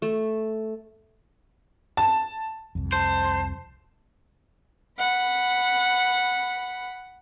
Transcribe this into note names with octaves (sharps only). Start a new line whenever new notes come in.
A3
A5
C2 F2
C5 A5
F#5 B5